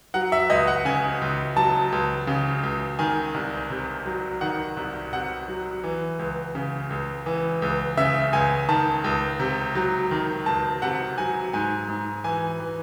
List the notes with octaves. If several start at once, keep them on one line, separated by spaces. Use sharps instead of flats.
F#3 F#5
E5
C#2 D#5
F#5
C#3 G#5
C#2
F#3 A5
C#2
C#3
C#2
D#3 G#5
C2
C3
F#3
D#3 F#5
C2
C3 F#5
F#3
E3
C#2
C#3
C#2
E3
C#2
C#3 E5
C#2 G#5
D#3 A5
C#2
C3
F#3
D#3
C#2 A5
C3 F#5
F#3 G#5
G#2 G#5
G#2
E3 G#5
E3